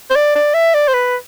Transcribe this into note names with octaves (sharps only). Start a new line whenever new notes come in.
C5
D5
D5
E5
D5
C5
B4